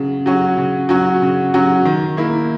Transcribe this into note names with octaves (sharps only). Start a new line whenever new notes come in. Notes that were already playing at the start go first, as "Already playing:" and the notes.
Already playing: C#3 F#3
F#3 C#4 F#4
C#3
F#3 C#4 F#4
C#3
F#3 C#4 F#4
D#3
A#3 E4